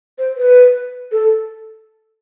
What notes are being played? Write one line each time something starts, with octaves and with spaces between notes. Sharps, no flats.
C5
B4
A4